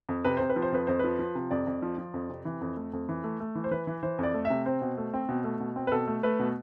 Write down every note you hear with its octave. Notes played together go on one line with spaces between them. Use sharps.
F2
C3 B4
C3 C5
B4
F3
C5
F2 B4
F2 C5
F3 B4
F3
C3
F2 D5
F2
F3
F3
F2
C3
E3
F2
A3
F2
E3
A3
A3
E3
C5
E3 B4
E3
E3 C5
F2 D5
A3
E5
C3
C4 C5
B2
A3
C4
B2
A3
B2
C4
B4
B2 A4
A3
A3 B4
B2